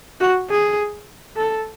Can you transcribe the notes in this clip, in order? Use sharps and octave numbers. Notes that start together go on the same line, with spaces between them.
F#4
G#4
A4